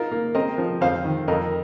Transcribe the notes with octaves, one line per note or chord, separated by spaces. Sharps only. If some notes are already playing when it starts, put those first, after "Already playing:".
Already playing: D#4 F4 A#4
A#3
C4 A#4 D#5
F3
F2 C5 F5
D#3
F2 A#4 D#5